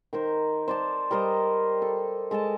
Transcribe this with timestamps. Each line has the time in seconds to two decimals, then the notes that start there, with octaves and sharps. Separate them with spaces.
0.13 D#3 A#4 C5
0.68 C5 D5 A5
1.11 G3 A#4 C5 D#5
1.82 A4
2.31 G#3 A4 D#5 A5